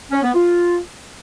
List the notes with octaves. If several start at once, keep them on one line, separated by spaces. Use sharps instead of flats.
C#4
B3
F4